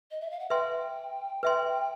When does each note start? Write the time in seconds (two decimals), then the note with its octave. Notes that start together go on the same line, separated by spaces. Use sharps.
0.11 D#5
0.21 E5
0.31 F5
0.40 F#5
0.50 B4 E5 G5 G#5 C6
1.43 B4 E5 G#5 C6